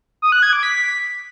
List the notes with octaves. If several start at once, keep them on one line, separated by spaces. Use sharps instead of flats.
D#6
F#6
G#6
D6
B6